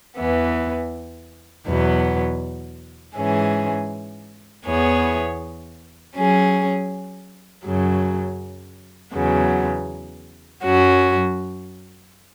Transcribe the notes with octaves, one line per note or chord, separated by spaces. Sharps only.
E2 E3 B3
E2 B2 F#3 B3
G#2 E3 C#4 G#4
E2 E3 B3 G#4 C#5
F#3 C#4 G#4
F#2 C#3 F#3
E2 C#3 F#3 B3
F#2 F#3 C#4 F#4